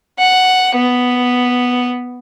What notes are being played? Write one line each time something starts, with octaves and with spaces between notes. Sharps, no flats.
F#5
B3